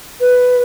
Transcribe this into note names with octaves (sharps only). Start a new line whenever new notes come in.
B4